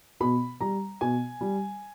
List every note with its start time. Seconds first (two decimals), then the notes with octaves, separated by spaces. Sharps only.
0.20 B2 B5
0.60 G3 A#5
1.01 B2 G#5
1.41 G3